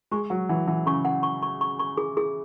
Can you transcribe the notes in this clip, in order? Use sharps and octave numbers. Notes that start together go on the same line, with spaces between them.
G#3 C#6
F#3 F#5
E3 F#5
E3 F#5
C#3 C#6
F#5
C#6
C#6
C#6
C#6
G#4
G#4